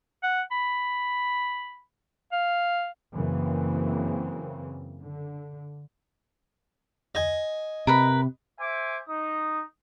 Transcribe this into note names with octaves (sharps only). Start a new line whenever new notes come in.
F#5
B5
F5
F#2 C#3 E3 A#3 C4
D3
D#5 G#5
C3 A#4 B4 B5
C5 E5 G#5 D6
D#4 D#6